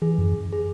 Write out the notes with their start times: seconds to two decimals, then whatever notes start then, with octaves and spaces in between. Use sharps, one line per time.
0.02 E3 G#4
0.18 F#2
0.53 G#4